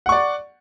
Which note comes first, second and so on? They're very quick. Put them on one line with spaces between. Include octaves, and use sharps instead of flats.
F#5 C#6 D5